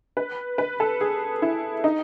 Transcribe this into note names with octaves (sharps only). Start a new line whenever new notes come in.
B4
B4
A4
G#4
E4
D#4